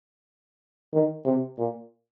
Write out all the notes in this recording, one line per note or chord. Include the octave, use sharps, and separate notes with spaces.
D#3
C3
A#2